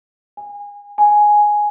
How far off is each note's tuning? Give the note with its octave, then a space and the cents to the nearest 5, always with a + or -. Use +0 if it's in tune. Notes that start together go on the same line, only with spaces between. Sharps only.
G#5 -25
G#5 +5